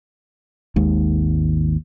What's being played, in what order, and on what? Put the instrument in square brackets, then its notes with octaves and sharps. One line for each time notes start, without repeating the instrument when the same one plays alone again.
[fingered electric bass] G#1 D#2 G#2